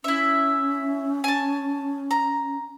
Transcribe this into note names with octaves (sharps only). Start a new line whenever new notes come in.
C#4 E4 E5
G#5 A5
A#5